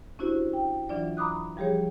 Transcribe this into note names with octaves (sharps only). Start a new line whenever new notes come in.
C#4 D4 E4 F#4 G4 C5
G5
E3 F#3 D4 F4 D5
A#5 B5 D6 D#6 F#6
F3 G3 G4 G#4 C#5